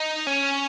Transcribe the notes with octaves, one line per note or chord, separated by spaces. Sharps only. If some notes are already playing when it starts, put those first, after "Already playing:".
Already playing: D#4
C#4